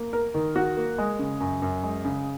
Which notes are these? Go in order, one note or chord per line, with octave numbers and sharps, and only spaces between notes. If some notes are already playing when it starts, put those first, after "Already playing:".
Already playing: A#3
A#4
D#3
F#4
A#3
G#3
C#3
F#2
F#2
G#3
C#3